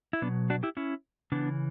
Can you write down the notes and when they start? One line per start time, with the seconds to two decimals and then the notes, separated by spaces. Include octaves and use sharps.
0.13 E4
0.22 B2 F#3 B3 D4
0.50 D4 F#4
0.63 E4 G4
0.77 C#4 E4
1.32 C#3 E3 B3 D4